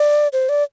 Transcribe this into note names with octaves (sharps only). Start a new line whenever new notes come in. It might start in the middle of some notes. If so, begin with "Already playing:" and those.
Already playing: D5
C5
D5